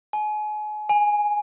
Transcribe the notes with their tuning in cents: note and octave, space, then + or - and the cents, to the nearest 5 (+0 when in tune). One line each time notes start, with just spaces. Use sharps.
G#5 +35
G#5 +0